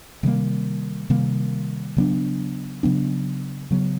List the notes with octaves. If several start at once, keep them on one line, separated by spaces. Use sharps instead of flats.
C3 D#3 G3 A#3
C3 D#3 G3 A#3
C#3 F#3 B3 D4
C#3 F#3 B3 D4
C#3 F#3 B3